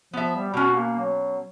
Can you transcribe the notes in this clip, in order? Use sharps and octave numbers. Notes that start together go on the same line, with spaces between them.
F3 B3 E5
G3
B2 C#4 F#4
A#3
F#3